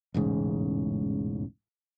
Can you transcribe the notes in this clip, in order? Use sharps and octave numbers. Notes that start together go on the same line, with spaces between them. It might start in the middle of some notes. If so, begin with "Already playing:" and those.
E1 A1 G#2 C#3